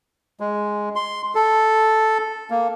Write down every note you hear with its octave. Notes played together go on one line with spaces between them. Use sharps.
G#3
C6
A4
A#3